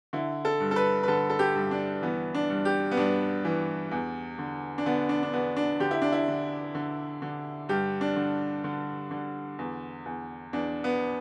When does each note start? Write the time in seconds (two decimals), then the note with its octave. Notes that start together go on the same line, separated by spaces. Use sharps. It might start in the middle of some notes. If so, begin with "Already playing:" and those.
0.13 D3 E4
0.45 A4
0.60 G2
0.71 A4
0.76 B4
1.03 B4
1.08 D3 A4
1.30 A4
1.39 G4
1.55 G2
1.71 D4
2.02 E3 B3
2.35 D4
2.50 G2
2.65 G4
2.91 B3
2.97 G2 D4
3.45 E3
3.91 E2
4.39 D3
4.78 D4
4.86 D3 B3
5.09 D4
5.23 D4
5.33 E2 B3
5.57 D4
5.80 D3 G4
5.91 E4
6.02 D4
6.12 E4
6.28 D3
6.75 D3
7.22 D3
7.69 G2 G4
8.01 D4
8.16 D3
8.64 D3
9.11 D3
9.59 E2
10.06 E2
10.53 E2 D4
10.84 B3